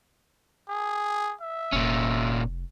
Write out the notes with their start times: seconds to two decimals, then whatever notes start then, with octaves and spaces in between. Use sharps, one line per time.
0.69 G#4
1.41 E5
1.72 F1 A#2 C#4